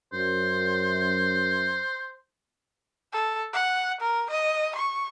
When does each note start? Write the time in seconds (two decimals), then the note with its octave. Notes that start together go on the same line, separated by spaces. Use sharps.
0.13 F#2 C5
3.13 A4
3.53 F#5
4.00 A#4
4.30 D#5
4.75 C#6